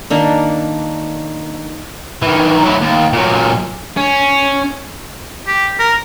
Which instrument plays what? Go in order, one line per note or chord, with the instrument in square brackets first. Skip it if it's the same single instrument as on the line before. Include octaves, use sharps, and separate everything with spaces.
[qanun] D#3 A#3 D4
[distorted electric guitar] D#3 E3
F#3 E4
D#2
A#2 F#3
C#4
[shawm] G4
A#4